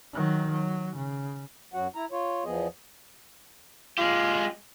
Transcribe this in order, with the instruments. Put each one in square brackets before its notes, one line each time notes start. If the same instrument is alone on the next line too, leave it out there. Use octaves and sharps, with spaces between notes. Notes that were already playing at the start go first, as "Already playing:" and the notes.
[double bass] D#3 F#3
F#3
C#3
[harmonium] F#2 F#3 F#4 F#5
E4 A#5
F4 C#5
E2 F3 B3 G#4 D#5
[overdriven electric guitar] G#3 G4 [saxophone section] F4